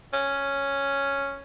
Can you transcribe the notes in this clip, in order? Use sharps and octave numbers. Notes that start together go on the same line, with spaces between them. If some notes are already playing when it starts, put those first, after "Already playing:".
C#4